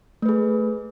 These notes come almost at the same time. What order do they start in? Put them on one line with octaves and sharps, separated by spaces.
A3 B4 G#4